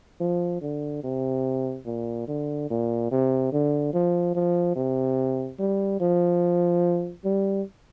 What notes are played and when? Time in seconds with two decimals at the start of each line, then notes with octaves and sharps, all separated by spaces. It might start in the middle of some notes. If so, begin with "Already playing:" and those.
0.20 F3
0.62 D3
1.03 C3
1.86 A#2
2.28 D3
2.70 A#2
3.11 C3
3.53 D3
3.93 F3
4.35 F3
4.76 C3
5.59 G3
6.00 F3
7.25 G3